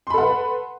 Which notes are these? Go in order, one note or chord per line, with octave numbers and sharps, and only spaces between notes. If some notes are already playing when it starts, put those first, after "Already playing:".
A4 B4 F#5 B5 C6